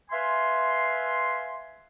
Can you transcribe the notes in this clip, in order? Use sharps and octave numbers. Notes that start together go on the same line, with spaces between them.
B4 E5 F5 G#5 C6